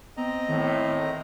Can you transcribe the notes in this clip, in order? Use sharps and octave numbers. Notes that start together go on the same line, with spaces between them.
B3 C4 D#5 A#5
A2 D#3